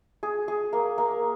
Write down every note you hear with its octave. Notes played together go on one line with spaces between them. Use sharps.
G#4
G#4
A#3
A#3